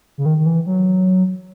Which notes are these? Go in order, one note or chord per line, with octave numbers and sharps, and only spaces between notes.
C#3
D#3
D#3
E3
F#3